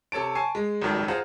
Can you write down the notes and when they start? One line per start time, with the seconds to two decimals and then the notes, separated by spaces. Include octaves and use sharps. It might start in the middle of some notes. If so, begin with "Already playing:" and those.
0.12 C3 A4 C#5 A5 D7
0.35 G#5 A5 C#6 C7
0.55 G#3
0.81 G#1 C#2 F#2 D#3 G3 A4
1.08 F4 G#4 C5 F#5 A#5